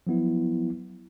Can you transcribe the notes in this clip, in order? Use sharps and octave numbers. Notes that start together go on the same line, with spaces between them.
F3 F#3 B3 E4